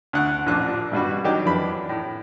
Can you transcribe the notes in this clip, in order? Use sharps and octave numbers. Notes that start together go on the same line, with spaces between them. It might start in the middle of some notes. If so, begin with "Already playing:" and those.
D2 F#5 F#6
A1 A#2 F3 D4 F#6
G2 B2 G3 F#4
D#3 F#3 D4 D#4 G4
F2 E3 D4 B5
A2